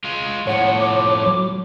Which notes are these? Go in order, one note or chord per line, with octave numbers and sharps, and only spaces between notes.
G#3 F4
A2 F3 C#5 F#5
D6
F#3